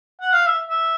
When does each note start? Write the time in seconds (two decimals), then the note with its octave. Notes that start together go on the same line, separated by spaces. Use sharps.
0.21 F#5
0.33 F5
0.46 E5
0.70 E5